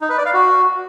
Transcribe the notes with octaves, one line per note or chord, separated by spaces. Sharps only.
D#4
B4
D5
F5
F#4